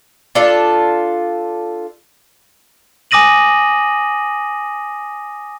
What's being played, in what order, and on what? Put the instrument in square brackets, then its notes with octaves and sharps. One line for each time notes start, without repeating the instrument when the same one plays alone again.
[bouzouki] D4 F4 A4
[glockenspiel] G#5 D6 D#6 A#6 D#7 F#7